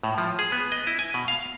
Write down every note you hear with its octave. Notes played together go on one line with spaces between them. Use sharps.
A2
F3
G#4
B3
D#5
E4
G#5
B2
F5